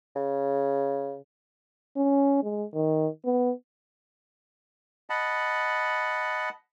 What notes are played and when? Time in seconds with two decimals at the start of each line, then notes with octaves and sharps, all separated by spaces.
0.15 C#3
1.97 C#4
2.43 G#3
2.74 D#3
3.25 B3
5.10 D#5 F#5 A5 B5